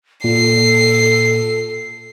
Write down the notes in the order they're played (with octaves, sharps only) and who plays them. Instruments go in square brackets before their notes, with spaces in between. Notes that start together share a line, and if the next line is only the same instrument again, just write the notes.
[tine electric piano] A#2 [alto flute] A4 [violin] C7